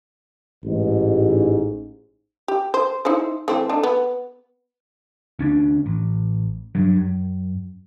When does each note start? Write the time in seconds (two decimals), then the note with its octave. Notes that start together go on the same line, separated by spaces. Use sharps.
0.65 A1 G#2
2.48 G4
2.74 C5
3.05 D#4 E4 C5
3.48 E3 A3 C4
3.69 A3 D4 D#4
3.83 B3
5.39 D2 C#4 D4
5.86 A1
6.75 G2 F#3
6.96 F#2